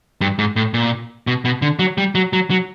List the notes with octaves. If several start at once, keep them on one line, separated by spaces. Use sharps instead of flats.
G2
G#2
A2
A#2
B2
B2
D3
F#3
G3
F#3
F#3
F#3